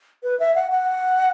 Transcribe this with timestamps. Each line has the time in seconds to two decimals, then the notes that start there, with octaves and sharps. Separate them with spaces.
0.23 B4
0.40 E5
0.55 F#5
0.71 F#5